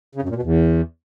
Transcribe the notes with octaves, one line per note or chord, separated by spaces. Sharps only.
C#3
F#2
A#2
B2
E2